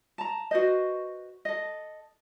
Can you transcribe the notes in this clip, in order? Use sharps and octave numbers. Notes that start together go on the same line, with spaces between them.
A5 A#5
F#4 B4 C5 D#5
A4 D#5